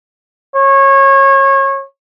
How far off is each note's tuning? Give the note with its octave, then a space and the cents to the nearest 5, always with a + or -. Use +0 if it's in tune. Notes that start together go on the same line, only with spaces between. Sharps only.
C#5 -25